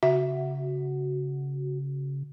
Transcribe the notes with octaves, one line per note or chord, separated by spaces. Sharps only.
C#3 F#4 E5